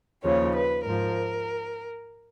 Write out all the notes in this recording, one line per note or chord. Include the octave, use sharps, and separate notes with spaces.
D#2 C#3 F3 C#5
B4
G#2 F3 A#4